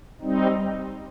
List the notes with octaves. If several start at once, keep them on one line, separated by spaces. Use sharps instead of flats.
G3 C4 D#4